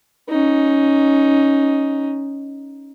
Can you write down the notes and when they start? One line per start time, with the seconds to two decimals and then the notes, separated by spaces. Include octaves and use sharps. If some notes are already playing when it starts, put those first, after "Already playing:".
0.29 C#4 D#4